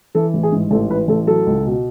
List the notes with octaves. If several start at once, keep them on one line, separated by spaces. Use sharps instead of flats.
E3 A4
A1
G#4
G#2
A1 A4
E3 B4
A1 A4
F#3 A4
C#2
B2